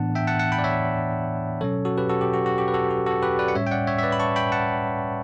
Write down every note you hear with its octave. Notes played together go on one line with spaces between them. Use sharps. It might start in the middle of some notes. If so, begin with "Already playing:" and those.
Already playing: A2 E3 B3 D4 F#5 A5
E5 G5
F#5 A5
F#5 A5
G5 B5
D5
C#5 E5
B2 F#3 C#4 A4 C#5
F#4 A4
G4 B4
F#4 A4
G4
F#4
F#4
G4
B4
F#4 A4
F#4
F#4 A4
G4 B4
B4 D5
F#5
A2 G3 C#4 C#5 E5
G5
D5 F#5
C#5 E5
E5
B4 D5
B5
A5 C#6
G5 B5
F#5 A5